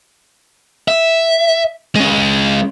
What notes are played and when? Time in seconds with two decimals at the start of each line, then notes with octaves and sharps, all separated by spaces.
0.88 E5
1.96 G#3 C#4